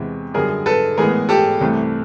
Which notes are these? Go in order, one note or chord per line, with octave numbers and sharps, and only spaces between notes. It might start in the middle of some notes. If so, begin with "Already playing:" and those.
Already playing: E2 C3 E3 G#3
F#2 D3 G3 G#4 A#4
A4 B4
A2 E3 G#3 B3 G#4 A#4
G4 A4
C2 C3 E3 A3